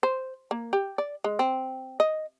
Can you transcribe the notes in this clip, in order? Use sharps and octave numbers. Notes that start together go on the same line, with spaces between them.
C5
A#3
G4
D5
G#3
C4
D#5